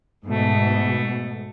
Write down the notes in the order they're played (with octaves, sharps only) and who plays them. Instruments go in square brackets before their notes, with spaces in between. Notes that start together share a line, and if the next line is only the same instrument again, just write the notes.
[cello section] G#2 B2 [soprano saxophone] A3